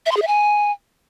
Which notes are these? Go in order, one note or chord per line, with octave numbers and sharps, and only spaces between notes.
E5
C6
G#4
E5
G#5